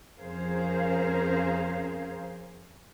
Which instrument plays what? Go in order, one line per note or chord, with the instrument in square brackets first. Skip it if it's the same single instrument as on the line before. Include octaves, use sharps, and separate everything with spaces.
[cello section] F2 C#4 G#4 A#4 C5 F5